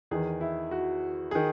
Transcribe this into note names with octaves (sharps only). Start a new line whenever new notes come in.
E2 D#3 G#4
E4
F#4
D#3 G#4